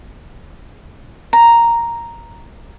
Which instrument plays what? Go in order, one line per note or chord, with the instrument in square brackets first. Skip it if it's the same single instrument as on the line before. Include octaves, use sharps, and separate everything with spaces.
[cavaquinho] A#5